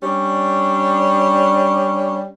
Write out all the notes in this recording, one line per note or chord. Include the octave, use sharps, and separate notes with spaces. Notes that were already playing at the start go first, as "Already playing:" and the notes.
G3 C#4 D4